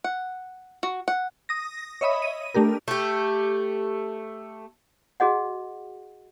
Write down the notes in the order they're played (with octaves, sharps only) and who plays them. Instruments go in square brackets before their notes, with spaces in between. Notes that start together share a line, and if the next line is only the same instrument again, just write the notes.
[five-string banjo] F#5
F#4
F#5
[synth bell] D#6 A#6
C#5 D#5 E5 B5 D#6
D#7
A3 D4 G4 A#4
[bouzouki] A3 G4
[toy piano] F#4 G#4 D#5 F#5